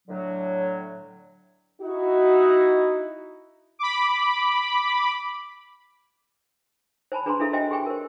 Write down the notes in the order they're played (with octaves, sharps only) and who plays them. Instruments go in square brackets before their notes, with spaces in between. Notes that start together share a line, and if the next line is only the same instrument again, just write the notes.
[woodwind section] A2 D3 F#3
[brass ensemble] D#4 E4 F#4
[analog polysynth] B5 D6
[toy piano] C5 G#5 A5 B5
D4 G#4 B4 G#5 A#5 C6
D4 E4 G#4 A4 E5
F#4 C5 D#5 E5 G5 G#5
G4 G#4 G5 G#5
A#4 C5